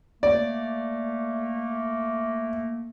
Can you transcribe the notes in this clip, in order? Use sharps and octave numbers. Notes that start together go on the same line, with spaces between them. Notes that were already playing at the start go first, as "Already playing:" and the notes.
A3 A#3 D5